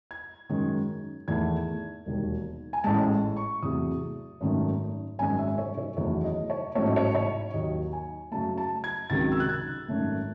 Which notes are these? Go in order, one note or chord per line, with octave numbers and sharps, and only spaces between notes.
G#6
F#2 D#3 G#3
E2 D#3 A3 G#6
E1 D#2 D#3 F#3
G#5
A1 A2 G#3 A5
C#6
E2 C3 F#3 A3 D#6
G#1 F#2 D#3 A3
G#1 F#2 D#3 G#3 G#5
E5
C#5
C#5
F#1 E2 D#3 F#3 A3 C#5
D#5
C#5
A1 G#2 F#3 A3 C#5
D#5
C#5
C#5
D#2 D#3 F#3 D#5
G#5
F#2 C#3 F#3 A3 A5
A5
G#6
C#2 C3 D#3 F#3 A6
E6
F#6
G#6
G#1 F#2 D#3 A3